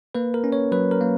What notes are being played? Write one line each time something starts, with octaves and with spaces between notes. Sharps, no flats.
A#3 B4
A#4
C#4
C#5
F#3 B4
A#4
A#3